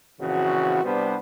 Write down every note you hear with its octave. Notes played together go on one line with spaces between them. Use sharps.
A#1 C#3 E3 C4 F#4
C2 G3 B3 D4 B4 C5